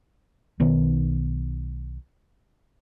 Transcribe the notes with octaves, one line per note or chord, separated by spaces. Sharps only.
B1 D#3 B3